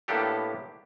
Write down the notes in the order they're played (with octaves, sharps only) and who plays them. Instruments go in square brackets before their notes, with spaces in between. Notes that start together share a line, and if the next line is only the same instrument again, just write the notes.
[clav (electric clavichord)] A2 A#3 B3 D4 G4 A4